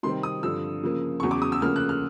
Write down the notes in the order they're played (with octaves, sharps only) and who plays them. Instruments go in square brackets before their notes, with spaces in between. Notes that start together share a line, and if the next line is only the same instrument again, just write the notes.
[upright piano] C3 D#3 G3 C4 C6
D#6
G2 D3 F3 E6
C#3 F3 A#3
E2 C#3 F#3 C#6
D6
D#6
E6
D2 C#3 F3 A#3 C#4 F6
F#6
F6